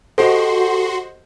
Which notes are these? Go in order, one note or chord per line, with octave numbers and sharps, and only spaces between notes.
F#4 G4 A4 C5 D#5 C6